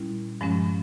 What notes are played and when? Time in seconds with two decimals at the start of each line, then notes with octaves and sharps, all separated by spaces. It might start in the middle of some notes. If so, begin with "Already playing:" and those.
Already playing: A#2 G3 C#4 E4
0.41 G2 F3 G#3 C#4